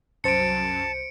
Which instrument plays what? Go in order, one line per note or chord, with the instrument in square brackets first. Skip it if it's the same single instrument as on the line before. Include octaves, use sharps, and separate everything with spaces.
[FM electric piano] C2 C5 [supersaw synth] F#2 [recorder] A5 [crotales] C#7 D7